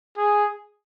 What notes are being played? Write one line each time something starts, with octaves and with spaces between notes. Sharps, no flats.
G#4